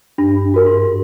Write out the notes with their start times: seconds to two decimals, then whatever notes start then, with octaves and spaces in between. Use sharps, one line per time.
0.18 G2 D4
0.54 F#4 A#4
0.66 G#2